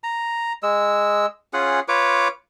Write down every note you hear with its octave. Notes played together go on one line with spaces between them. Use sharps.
A#5
G#3 E6
C#4 F4 G#4 F#5
F4 B4 C#5 D6